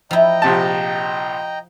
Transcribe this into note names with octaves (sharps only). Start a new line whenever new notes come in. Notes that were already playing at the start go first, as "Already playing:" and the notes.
F3 E4 D#5 G5 A#5
A#1 C3 A5